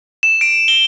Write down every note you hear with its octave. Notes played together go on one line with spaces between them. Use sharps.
E7
D7
G7